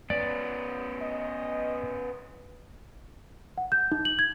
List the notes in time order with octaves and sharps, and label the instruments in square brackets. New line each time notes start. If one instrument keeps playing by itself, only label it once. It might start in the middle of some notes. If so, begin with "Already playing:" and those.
[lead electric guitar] B3 C#4 [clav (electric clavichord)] D5
[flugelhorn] D#5
[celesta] F#5
G6
D#4
F#7
G#6